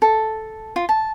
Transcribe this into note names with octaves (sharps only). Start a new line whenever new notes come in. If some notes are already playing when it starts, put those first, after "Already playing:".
A4
F4
A5